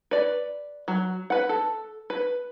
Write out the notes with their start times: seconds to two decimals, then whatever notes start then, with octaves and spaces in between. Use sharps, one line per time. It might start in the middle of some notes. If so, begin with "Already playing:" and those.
0.11 B4 D5
0.88 F#3
1.30 B4 F#5
1.49 A4
2.10 B4